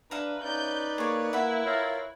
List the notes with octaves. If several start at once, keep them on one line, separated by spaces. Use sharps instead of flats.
D4 B4 E5 F5 A#5
C#4 D#4 B4 D5 G6
A#3 G#4 C#5 D6
A#3 E4 B4 E5 F#5 B5
F4 A#4 C#5 F5